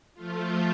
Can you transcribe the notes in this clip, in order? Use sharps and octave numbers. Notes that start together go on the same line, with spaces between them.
F3 A3 F4